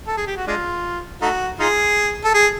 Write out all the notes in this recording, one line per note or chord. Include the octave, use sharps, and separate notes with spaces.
A4
G#4
G4
F#4
G#3 D4 F4
A3 D#4 F#4
D#4 F4 G#4
A4
G#4